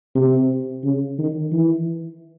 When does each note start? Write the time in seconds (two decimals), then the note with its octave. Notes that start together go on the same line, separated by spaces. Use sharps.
0.15 C3
0.84 C#3
1.18 D#3
1.52 E3